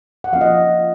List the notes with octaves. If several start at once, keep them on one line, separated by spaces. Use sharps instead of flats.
F#5
F3 A#3 C#4 F5
D#5